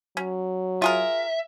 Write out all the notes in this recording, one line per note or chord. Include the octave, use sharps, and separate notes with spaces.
F#3 C#4
F4 G#4 A#4 E5